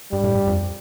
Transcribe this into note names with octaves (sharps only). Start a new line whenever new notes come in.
G2 G3
A2
G2
F2